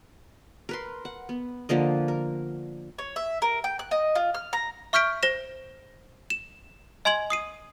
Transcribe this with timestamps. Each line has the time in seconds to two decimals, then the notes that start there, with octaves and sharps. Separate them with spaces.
0.69 A#4 B4 C6
1.05 F#5
1.29 B3
1.69 D3 F3 A#3 D#5
2.08 A#4
2.98 C#5
3.16 E5
3.42 A#4
3.64 G5
3.79 F#6
3.91 D#5
4.15 F4
4.34 F6
4.53 A#5
4.93 E5 C#6 F6 G6 B6 D7
5.23 C5 A#6 E7
6.30 E7
7.05 D#5 G#5 C6 G#6 F#7
7.30 D#6 C7 D#7